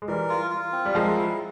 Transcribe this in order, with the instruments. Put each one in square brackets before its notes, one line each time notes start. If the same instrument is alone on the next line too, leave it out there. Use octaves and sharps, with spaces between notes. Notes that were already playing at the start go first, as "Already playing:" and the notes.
[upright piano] G#3
[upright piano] E3 G3 [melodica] A#4
[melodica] F4
F4
C4
[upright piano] G3
[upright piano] F3 G#3 [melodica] A#4
[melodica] E4